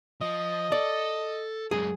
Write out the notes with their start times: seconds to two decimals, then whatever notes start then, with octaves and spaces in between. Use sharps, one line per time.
0.21 F3 D#5
0.72 A4 D5
1.71 F#2 G#3 G#4